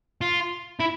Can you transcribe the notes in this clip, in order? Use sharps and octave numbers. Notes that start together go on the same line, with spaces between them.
F4
E4